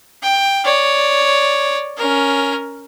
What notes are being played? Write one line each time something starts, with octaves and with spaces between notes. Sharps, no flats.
G5
C#5 D5
C#4 A#4